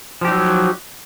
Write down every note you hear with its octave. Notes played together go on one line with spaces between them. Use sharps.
F3 F#3 D#4 G4